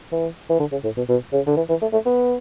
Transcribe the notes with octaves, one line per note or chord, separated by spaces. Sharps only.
E3
E3
D3
C#3
A2
B2
B2
C#3
D3
E3
E3
A3
A3
B3